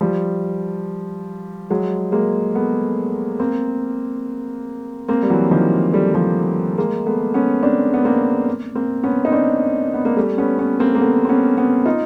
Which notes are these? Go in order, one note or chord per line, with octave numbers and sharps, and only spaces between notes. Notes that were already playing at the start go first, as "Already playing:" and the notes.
F3 G3
F#3 G#3
G#3 A#3
A3 B3
A#3 C4
A#3 C4
G3
E3 F#3
D#3 F3
G3 A3
F3 G3
G#3 A#3
A3 B3
B3 C#4
C4 D4
B3
A#3 C4
A#3 C4
B3 C#4
D#4
C4 D4
B3
A#3
G3 A3
B3 C#4
B3 C#4
A#3 C4
A#3
A3 B3
C4
B3 C#4
B3 C#4
D#4 F4